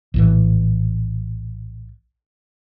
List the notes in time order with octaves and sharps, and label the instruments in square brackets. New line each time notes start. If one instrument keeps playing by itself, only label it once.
[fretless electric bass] A#1 A2 E3